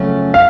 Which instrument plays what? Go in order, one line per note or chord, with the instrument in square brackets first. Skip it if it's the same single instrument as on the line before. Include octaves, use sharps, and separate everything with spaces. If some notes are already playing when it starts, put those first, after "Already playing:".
Already playing: [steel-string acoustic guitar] F2 C#3 F#3 A3 C#4
[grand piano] F5